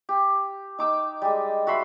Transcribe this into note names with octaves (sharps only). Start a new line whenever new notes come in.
G4
D#4 D6 E6
G3 G#3
F#4 E5 B5 C6